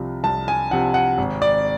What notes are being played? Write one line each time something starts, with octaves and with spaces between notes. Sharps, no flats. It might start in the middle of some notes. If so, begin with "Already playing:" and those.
Already playing: C2 C3 F3
C2 A5
G#5
C3 F3 F#5
F#5
G#1
D5